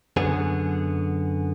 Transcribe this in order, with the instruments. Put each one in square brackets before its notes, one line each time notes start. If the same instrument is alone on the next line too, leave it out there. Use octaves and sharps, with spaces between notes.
[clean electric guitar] F#2 D3 B3 G#4